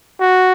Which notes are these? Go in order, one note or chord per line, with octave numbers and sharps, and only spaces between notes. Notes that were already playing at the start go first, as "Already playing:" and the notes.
F#4